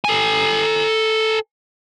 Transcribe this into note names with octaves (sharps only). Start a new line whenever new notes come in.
A4 G#5